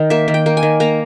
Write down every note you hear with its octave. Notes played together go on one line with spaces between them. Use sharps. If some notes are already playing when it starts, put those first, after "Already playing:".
Already playing: D#3
A#3 E5
D#3
G5
A#3
G#5
D#3
A#3 A#5